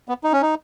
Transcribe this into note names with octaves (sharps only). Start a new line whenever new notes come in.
B3
D#4
C#4
D#4